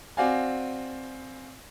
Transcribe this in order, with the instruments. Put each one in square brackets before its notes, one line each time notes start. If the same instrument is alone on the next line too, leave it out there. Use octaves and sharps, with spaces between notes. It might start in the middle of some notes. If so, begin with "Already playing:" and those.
[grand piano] C4 F#4 D5 F5 G#5